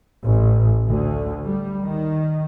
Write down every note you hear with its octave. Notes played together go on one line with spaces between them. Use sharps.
A1
D2
G3
D#3